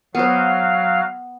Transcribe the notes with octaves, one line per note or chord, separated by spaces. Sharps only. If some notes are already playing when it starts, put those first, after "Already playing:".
F#3 B3 C5 F5